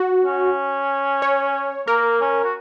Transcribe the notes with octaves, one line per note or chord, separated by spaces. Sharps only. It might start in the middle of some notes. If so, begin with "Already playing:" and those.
Already playing: F#4
C#4
C#5
A#3 A#4
C#4
F#4